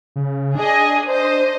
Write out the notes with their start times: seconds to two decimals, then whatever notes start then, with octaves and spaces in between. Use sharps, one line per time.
0.16 C#3
0.55 D4 G#4 D#5
1.05 C5 D#5